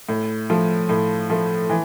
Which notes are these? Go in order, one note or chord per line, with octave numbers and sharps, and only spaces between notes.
A2
F3 A3
A2
F3 A3
E3